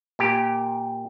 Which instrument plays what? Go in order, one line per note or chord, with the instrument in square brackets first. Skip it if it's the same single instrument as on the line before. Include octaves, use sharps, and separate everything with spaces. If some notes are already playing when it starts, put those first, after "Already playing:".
[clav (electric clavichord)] A#2 G4